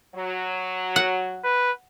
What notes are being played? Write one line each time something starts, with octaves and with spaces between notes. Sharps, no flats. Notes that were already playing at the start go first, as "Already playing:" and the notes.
F#3
F#5
B4